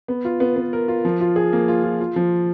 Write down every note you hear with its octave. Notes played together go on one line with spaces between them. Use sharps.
B3
F4
B3
B3
A#4
F4
F3
F4
G#4
A#3
F4
F4
F4
F3